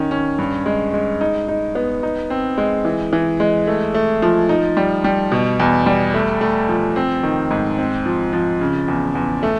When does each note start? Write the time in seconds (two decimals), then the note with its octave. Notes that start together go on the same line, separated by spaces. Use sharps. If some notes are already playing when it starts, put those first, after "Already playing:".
Already playing: D#3 C#4
0.11 C#4
0.38 G2
0.66 G#3
0.94 G#3
1.21 D#4
1.48 D#4
1.75 B3
2.03 D#4
2.30 C4
2.58 G#3
2.85 E3
3.13 E3
3.40 G#3
3.67 A3
3.94 A3
4.22 F3
4.49 D#4
4.77 G3
5.04 G3
5.32 B2
5.60 E2
5.86 G3
6.14 A3
6.41 A3
6.69 F3
6.96 C4
7.23 D#3
7.51 G#2
7.78 C4
8.06 F3
8.33 F3
8.61 C#3
8.88 E2
9.15 E2
9.43 A3